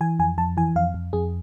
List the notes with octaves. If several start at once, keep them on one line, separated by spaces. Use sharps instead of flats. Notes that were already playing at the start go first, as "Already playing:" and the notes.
E3 G#5
F2 G#5
F2 A5
E3 G#5
F2 F5
F2
F2 G#4